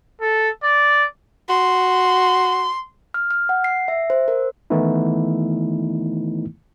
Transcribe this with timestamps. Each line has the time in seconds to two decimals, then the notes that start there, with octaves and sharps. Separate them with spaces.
0.21 A4
0.64 D5
1.49 F#4 C6
3.14 F6
3.31 F6
3.49 F#5
3.64 C7
3.88 E5
4.10 C5
4.28 A#4
4.70 D#3 E3 A3 B3 D#4 E4